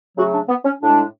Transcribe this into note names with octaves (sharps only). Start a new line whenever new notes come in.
C#3 F#3 A3 F#4
D4
B3
C#4
A2 G#3 D4